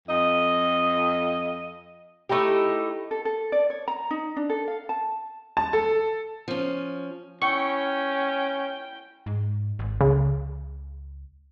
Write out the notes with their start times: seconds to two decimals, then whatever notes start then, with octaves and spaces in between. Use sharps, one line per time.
0.07 F2 D#5
2.29 A3 D#4 E4 G4
3.11 A4
3.25 A4
3.52 D5
3.70 C#5
3.88 A#5
4.11 D#4
4.36 D4
4.50 A4
4.68 F5
4.89 A5
5.57 A5
5.73 A4
6.48 F3 C#4
7.42 C#4 E4 G5 C#6
9.26 G#2
9.79 G#1
10.01 C#2 C#3